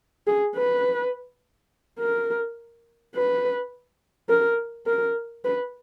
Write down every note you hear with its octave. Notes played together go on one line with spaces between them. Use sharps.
G#4
B4
A#4
B4
A#4
A#4
B4